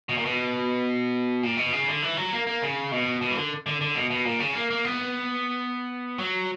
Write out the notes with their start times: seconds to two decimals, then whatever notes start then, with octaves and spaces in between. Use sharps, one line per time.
0.09 B2
0.17 A#2
0.25 B2
1.43 A#2
1.57 B2
1.73 C#3
1.88 D3
2.02 E3
2.17 F#3
2.32 A#3
2.47 A#3
2.62 C#3
2.92 B2
3.21 B2
3.31 E3
3.36 D3
3.66 D3
3.81 D3
3.95 B2
4.10 B2
4.25 A#2
4.40 C#3
4.55 A#3
4.70 A#3
4.85 B3
6.19 F#3